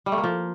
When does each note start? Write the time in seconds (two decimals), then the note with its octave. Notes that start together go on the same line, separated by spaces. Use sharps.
0.06 G3
0.12 A3
0.18 A#3
0.24 F3